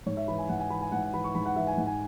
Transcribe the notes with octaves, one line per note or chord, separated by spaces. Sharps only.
G#2 C#5
E5
E3 B5
G#5
G#2 F#5
G#5
E3 B5
G#5
G#2 F#5
F#5
E3 B5
C#6
G#2 B5
F#5
E3 E5
G#5
G#2 F#5
G#5